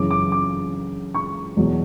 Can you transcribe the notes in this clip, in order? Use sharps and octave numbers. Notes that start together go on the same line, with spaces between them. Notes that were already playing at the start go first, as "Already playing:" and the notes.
Already playing: F#2 C#3 E3 D6
D6
D6
C#6
E2 B2 F#3